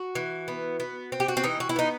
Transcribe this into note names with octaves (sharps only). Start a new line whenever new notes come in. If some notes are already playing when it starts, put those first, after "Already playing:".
Already playing: F#4
E3
B3
B3
C4
G4
F#4
C4
E3 D#4
F#4
E4
B3 D#4